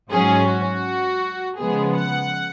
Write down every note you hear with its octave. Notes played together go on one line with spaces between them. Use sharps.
G#2 F#3 C#4 G#4
F#4
C#3 F3 G#3 B3 G#4
F#5